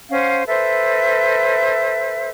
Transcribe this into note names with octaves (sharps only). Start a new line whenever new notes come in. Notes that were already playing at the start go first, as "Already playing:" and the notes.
C#4 C5 F5 F#5
A4 B4 C5 E5